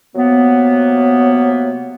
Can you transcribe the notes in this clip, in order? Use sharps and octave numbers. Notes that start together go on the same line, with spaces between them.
C3 F#3 A#3 B3